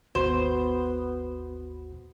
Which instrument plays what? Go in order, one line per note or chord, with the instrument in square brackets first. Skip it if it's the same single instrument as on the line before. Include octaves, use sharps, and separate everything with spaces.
[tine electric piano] G#1 D#2 F#4 [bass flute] B3 [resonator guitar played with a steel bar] C5